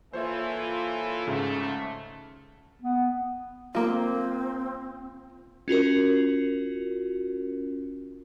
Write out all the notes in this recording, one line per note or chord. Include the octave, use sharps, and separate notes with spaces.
E3 A#3 F4 A4 C5 C#5 E5
G#2 C#3 A3
B3
A#3 C4 F4
C#4 F4 F#4 A#4